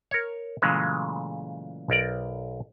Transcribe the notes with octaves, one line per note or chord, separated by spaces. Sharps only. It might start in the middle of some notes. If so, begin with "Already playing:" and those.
A#4 C#5
A#2 C#3 E3 F#3 G#3 A3
B1 A#4 D5